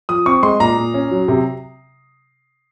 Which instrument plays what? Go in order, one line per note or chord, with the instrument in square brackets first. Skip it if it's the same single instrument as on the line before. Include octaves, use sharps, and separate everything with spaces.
[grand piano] F3 D#6
C4 C#6
G#3 C6
A#2 A#5
A#2
C#4
F#3
C3